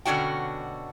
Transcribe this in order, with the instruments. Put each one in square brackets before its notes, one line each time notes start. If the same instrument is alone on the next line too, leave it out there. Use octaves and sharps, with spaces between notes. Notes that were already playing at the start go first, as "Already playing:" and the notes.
[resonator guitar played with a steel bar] B2 D3 C#4 D4 F#4 G5